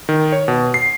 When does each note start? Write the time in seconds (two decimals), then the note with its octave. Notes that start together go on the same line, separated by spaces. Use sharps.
0.09 D#3
0.32 C#5
0.48 B2
0.74 C7